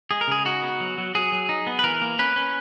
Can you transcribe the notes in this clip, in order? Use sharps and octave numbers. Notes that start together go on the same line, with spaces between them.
G#3 G#4
A#4
C#3 G#4
D#4 F#4
B3
F#3
F#3
F#3 G#4
F#3
D#4
B3
B4
E3 A#4
A#3
C#4 B4
C#4